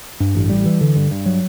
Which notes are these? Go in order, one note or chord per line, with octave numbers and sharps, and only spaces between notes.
G2
A1
G3
E3
D3
G2
G2
F#3